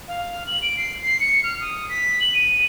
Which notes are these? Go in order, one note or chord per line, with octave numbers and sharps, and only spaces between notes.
F5
F#7
D7
C7
C7
C#7
F6
D#6
B6
F#7
D#7